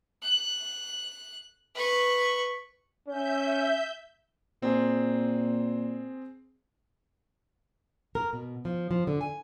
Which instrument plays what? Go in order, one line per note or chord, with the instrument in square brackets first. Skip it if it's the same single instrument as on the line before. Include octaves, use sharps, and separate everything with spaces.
[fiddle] F#6
B4 C#6
[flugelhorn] C#4 [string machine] E5 G6
[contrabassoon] A#2 [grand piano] C4 G#4
[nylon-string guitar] A#4
B2
F3
F3
D3
G#5